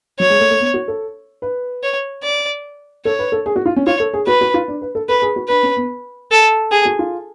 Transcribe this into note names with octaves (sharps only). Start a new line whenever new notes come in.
F#3 C#5
G#3
A3
A3
B3
F#4
A4
B4
C#5
D5
A4 C#5
B4
A4
G#4
F#4
F4
C#4
F4 C#5
A4
G#4
F#4 B4
F#4
F4
D4
B4
A4
A4 B4
G#4
F#4
D4 B4
C#4
B3
A4
G#4
F#4
F4